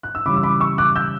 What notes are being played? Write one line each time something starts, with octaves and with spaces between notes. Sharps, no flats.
F#6
E6
C#3 E3 G3 B5 D6
E6
B5 D6
C#6 E6
D6 F#6
E6 G6